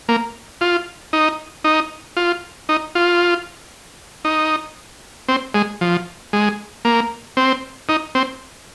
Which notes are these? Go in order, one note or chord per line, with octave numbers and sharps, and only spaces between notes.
A#3
F4
D#4
D#4
F4
D#4
F4
D#4
C4
G#3
F3
G#3
A#3
C4
D#4
C4